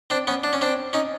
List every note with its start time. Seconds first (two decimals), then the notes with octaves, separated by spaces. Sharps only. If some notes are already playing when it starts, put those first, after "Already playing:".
0.10 C4 D4
0.27 B3 C#4
0.44 D4
0.53 C#4
0.61 C4 D4
0.93 C#4 D#4